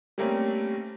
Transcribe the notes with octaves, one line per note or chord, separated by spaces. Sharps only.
G3 A3 A#3 C4 C#4